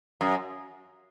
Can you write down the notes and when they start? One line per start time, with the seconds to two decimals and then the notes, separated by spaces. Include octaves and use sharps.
0.21 F#2